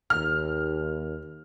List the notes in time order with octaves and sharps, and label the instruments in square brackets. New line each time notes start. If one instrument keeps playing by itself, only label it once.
[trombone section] D#2 [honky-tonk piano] F6